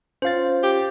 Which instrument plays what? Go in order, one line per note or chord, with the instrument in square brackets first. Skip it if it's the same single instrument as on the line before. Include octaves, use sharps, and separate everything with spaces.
[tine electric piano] C#4 F4 A6 [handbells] C5 F5
[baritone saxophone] G4